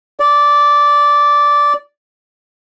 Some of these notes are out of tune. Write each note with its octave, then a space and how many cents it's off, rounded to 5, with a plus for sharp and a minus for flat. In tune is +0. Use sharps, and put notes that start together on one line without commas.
D5 -10